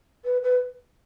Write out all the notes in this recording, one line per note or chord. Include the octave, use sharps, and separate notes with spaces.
B4
B4